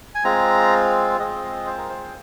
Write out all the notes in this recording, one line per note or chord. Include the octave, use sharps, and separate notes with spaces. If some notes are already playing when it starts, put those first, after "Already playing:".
G#5
G#3 C4 F4 A#5
G#3 C4 F4 D#5
C5
A#4
C5